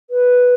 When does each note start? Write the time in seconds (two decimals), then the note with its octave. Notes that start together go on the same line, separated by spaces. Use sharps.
0.10 B4